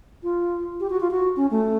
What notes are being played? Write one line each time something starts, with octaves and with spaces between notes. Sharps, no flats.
F4
G4
F#4
F4
F#4
C#4
A3